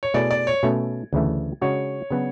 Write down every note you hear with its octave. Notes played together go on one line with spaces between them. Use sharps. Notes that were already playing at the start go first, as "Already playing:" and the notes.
C#5
B2 A3 E4 G#4 D5
D5
C#5
B2 A3 C#4
D2 C#3 E3 A3
C#3 G#3 D4 F#4 C#5
C#3 F#3 B3 D4 F#4